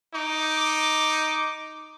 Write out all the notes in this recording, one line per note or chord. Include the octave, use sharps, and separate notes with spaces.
D#4 D6